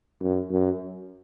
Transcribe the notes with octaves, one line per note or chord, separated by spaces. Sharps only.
F#2
F#2